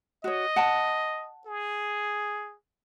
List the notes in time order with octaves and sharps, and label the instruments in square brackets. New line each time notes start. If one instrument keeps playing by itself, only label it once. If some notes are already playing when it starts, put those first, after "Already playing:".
[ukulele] F#4 C#5 [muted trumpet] D#5
[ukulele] F#5 A5
[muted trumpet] G#4